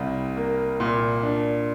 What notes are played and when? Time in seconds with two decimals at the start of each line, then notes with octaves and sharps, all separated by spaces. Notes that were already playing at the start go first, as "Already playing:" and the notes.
Already playing: C2 G3
0.37 A#3
0.80 A#2
1.23 D4